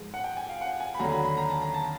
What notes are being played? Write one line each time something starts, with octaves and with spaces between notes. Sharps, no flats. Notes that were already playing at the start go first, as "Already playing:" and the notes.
Already playing: G#2 F3 G#3
F#5
G5
G#5
F5
F#5
G#5
B5
D#2 D3 F#3 A#5
B5
B5
A#5
A5
A#5
A5